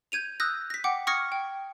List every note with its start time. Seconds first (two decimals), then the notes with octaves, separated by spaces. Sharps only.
0.12 G6 G#6 D#7 F7
0.40 D#6 E6 F#6 G6 A#6
0.70 A#6 B6
0.84 F#5 G5 D6
1.07 C#6 D#6 F6 G#6 A#6 C#7
1.32 G5